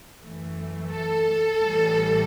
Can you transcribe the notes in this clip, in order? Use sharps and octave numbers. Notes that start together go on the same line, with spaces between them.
F#2 E3 A3
A4
A1 A2 E3 G3